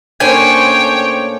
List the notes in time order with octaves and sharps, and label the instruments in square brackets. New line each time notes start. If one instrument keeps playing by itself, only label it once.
[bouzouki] A2 A#3 C5 [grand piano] C#4 D4 [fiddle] C#5 G5 [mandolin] G#5